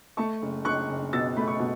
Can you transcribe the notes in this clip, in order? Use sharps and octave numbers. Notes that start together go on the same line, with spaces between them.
A3 A5 C#6
F#1
F#1 C#6 F#6
F#1
B2 E6 A6
A3 B5
C#6
B2